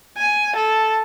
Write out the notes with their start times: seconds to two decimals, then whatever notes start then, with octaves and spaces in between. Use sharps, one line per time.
0.17 G#5
0.56 A4